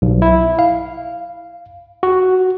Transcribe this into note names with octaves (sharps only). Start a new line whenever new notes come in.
B1
E4
F5
F#4